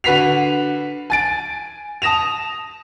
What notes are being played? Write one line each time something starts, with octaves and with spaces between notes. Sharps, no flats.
D3 F#4 B4 B6 C7 F7
G#5 A6 D7
A5 D#6 A#6 E7 F7